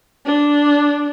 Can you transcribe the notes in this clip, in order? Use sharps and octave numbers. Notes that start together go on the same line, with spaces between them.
D4